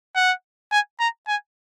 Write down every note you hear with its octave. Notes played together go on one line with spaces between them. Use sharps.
F#5
G#5
A#5
G#5